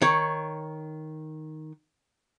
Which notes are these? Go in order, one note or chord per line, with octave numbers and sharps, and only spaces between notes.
D#3 C#5